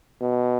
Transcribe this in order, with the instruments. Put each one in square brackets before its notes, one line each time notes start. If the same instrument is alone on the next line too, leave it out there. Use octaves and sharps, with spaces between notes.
[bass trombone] B2